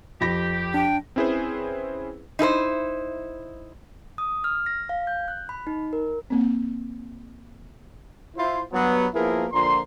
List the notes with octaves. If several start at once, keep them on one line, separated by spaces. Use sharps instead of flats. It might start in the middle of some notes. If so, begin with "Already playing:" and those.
F2 G4 B5 A#6
D4 G5
C4 C#4 E4 G#4 B4 C5
D#4 E4 A4 C5
D#6
F6
A#6
F5
G6
F#6
B5
D#4
A#4
A#3 C4
E4 F4 C5
G2 F#3 B3
F3 A#3 B3 E4 G#4 A#4
A#2 D3 F3 A#5 C6